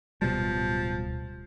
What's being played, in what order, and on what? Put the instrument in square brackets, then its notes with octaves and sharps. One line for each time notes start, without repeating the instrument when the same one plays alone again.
[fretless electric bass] D1 B2 G3 [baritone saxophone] F3